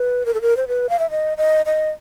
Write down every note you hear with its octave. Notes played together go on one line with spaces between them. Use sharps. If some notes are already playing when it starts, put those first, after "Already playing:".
Already playing: B4
A#4
A4
A#4
C5
B4
F5
E5
D#5
D#5
D#5